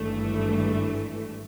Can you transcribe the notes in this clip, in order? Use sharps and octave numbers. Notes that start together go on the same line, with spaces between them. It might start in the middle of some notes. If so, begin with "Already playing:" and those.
Already playing: G#1 G2 E3 A3